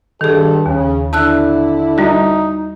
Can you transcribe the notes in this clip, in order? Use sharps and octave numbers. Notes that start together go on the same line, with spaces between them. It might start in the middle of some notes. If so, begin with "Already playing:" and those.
G2 D#3 G#4 A4
D#2 C#3
D3 D4 E4 A5 E6 F#6
G3 D#4 F#4